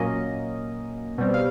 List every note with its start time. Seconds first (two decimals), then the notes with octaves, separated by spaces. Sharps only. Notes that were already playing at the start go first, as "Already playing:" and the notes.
Already playing: A#2 F#3 A#3 C#4 D#5
1.18 B2 G3 C4
1.34 F5